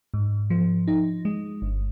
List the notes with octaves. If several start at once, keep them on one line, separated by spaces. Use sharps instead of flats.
G#2
F3
D#4
G#3
G1